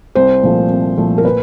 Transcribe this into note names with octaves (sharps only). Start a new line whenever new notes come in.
C2 C5
A#2 F3 A3
C2
A#2 F3 A3
A#4
A#2 B4